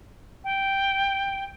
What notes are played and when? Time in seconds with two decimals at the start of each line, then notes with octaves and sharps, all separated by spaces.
0.44 G5